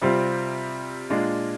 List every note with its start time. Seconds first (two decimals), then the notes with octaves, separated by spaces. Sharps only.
0.02 C3 G3 C4 F4
1.10 A#2 G#3 D4 F4